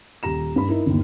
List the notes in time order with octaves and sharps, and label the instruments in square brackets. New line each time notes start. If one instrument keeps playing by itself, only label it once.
[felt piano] D#1 G4 A#5 E7
G2 B5
D#4 E4 A#4
G1 D#2